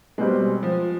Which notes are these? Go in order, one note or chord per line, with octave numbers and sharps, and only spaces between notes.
B2 G3 G#3 C4
F3